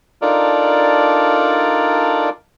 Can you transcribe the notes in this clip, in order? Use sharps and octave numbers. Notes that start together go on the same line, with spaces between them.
D4 D#4 F4 A4 A#4 D5